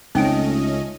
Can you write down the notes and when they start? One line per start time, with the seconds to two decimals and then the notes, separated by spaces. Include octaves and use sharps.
0.15 C#2 A3 C4 C#4 D#4 D#5 G5 D7